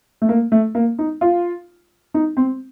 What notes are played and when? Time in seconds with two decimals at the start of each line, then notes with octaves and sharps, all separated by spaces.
0.22 A3
0.29 A#3
0.52 A3
0.75 A#3
0.99 D#4
1.21 F4
2.14 D#4
2.37 C4